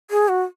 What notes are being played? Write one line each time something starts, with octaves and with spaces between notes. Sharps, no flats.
G#4
F#4